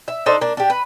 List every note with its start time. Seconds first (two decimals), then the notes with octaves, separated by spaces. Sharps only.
0.08 E5
0.26 D4 D#4 A4 C5
0.41 A#3 D4
0.57 D4 G4
0.70 B4